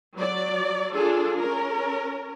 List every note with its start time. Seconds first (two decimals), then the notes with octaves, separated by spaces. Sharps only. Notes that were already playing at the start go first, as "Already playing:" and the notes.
0.15 F#3 D5
0.93 D4 F4 G#4 A4
1.39 C#4 A#4